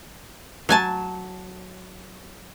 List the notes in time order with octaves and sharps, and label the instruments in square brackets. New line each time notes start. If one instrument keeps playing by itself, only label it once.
[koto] F#3 G#5 A5